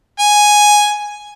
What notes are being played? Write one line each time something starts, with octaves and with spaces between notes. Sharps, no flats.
G#5